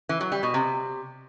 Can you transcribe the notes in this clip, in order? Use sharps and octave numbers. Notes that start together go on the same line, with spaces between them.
E3
F#3
G3
B2
C3